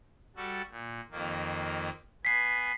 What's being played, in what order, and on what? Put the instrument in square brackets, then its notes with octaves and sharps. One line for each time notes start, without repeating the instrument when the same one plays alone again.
[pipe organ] G3 F#4 A4
A#2
F2 D#3 A#3
[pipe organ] B3 G#5 [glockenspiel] B6 C7